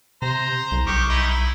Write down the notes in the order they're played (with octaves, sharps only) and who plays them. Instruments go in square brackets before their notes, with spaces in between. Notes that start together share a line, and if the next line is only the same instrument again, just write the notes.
[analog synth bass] C3 [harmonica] C5 A#5
[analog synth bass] C2
[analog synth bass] B1 [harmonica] D#3 G4 C#6
[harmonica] D#3 D#4 E4
E4